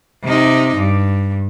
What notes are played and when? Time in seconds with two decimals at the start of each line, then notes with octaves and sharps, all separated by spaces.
0.23 C3 D#4
0.76 G2